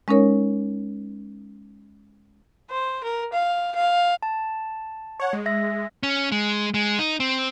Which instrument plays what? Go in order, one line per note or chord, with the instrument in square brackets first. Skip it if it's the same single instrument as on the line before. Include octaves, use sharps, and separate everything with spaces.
[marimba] G#3 C#4 D#4 A#4 C#5
[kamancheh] C5
A#4
F5
F5
[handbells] A5
[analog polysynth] C#5 F#5
G#3
[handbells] E5 A#6
[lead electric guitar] C#4
G#3
G#3
D#4
C4